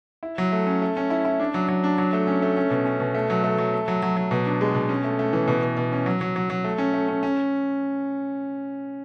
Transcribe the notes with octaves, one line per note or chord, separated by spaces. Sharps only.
E4
F#3
A3
C#4
A3
C#4
E4
E4
D4
F#3
F#3
D4
F#3
A3
C#4
A3
C#4
B2
C#4
B2
A3
F#3
A3
F#3
A3
F#3
F#3
F#3
B2
D4
G#3
B2
C#4
A3
A3
E3
B2
B2
B2
C#4
F#3
F#3
F#3
F#3
A3
C#4
A3
C#4
C#4